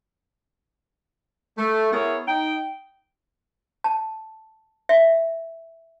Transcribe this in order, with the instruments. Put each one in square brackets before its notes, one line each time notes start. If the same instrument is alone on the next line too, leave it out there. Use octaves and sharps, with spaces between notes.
[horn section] A3
B3 E4 G#4 A#4 C#5
D#4 G5
[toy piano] A5
E5